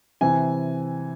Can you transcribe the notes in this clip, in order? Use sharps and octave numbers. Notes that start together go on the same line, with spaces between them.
C3 E3 G#5